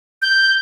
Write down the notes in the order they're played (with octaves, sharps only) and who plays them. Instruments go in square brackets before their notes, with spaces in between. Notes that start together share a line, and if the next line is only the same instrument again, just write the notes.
[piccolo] G6